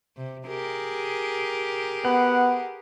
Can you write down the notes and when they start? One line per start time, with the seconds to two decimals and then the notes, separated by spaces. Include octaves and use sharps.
0.17 C3
0.48 G4 G#4 A#4
2.05 B3 F#5